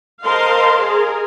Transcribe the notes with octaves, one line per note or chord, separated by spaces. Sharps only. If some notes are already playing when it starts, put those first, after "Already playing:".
A#4 C5 D#5 F5 A5 C6
G#4 A#4